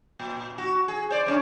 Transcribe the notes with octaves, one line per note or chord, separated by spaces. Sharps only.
A#2
F#4
G#4
C5 D5
F2 C#4 D4